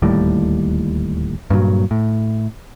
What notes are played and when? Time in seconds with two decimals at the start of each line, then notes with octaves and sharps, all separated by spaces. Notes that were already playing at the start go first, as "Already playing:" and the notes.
0.02 D1 D#2 A2 G3
1.50 G2 A#2 E3 F#3
1.91 A2